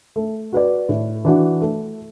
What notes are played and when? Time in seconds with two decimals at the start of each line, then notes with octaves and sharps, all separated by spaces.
0.16 A3
0.53 F#4 B4 D5
0.89 A2
1.25 E3 D4 F#4
1.61 A3